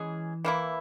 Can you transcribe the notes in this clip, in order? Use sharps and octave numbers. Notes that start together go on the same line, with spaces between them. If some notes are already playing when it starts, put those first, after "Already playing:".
Already playing: E3 G#3 C#4 G#4
E3 A#3 E4